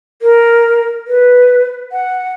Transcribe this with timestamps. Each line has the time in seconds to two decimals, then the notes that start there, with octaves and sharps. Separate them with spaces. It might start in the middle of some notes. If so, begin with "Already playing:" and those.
0.22 A#4
1.07 B4
1.92 F#5